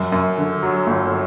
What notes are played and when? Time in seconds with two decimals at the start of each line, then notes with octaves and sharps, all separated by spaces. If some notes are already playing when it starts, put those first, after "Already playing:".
Already playing: F#2
0.12 F#2
0.37 D3
0.63 F#3
0.87 G1